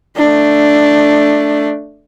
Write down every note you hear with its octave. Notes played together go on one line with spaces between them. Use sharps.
A3 D4